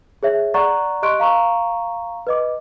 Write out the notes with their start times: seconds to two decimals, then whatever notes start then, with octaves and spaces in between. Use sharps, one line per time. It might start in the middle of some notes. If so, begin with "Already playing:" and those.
0.23 G#4 C#5 E5
0.54 D5 F#5 A#5 C#6 F#6 A6
1.02 G4 D#5 C6 C#6 F#6 D7
1.20 F5 A#5 C#6
2.27 B4 D#5 D6